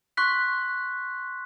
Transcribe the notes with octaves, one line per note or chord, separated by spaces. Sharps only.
C6 C#6 F#6 B6